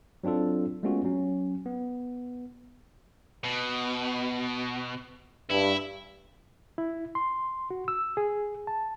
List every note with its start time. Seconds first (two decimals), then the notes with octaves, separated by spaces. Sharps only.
0.24 F#3 C4 D4 F4 A4
0.83 G#3 A3 B3 C#4 F4 F#4
1.05 F#3 C#4
1.66 B3
3.44 B2
5.50 G2 E4
6.78 E4
7.15 C6
7.71 F#4
7.88 E6
8.17 G#4
8.67 A5